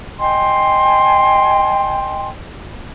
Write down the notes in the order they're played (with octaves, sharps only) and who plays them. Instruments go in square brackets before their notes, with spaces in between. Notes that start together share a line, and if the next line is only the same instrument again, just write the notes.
[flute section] D#5 G5 G#5 C6